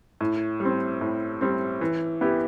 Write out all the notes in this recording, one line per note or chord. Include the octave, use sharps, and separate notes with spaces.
A2
G3
C4
A2
G3 C4
E3
B3 E4 G4